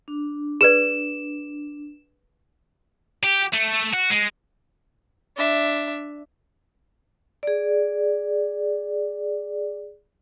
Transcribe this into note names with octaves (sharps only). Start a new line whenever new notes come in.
D4
G#4 B4 D5 E7
G4
A3
F#4
G#3
D4 E5
G#4 D5